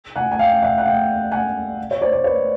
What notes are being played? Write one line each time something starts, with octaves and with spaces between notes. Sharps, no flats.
F#5 G#5
G#5
F5 G5
E5 F#5
F#5
F5 G5
F#5 G#5
C#5
C5 D5
D5
B4 C#5